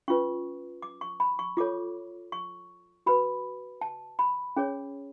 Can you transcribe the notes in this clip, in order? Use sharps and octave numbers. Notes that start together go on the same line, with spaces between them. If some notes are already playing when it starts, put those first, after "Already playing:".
C#4 F4 B4 C#6
D6
C#6
B5
C#6
F4 A4 C#5 D6
C#6
F#4 B4 B5
A5
B5
C#4 G#4 C#5